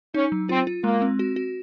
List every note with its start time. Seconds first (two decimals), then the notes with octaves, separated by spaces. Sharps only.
0.14 C#4 D#4
0.32 F#3
0.49 C4 F4
0.67 F4
0.84 G#3 A#3
1.02 C4
1.19 F#4
1.36 F#4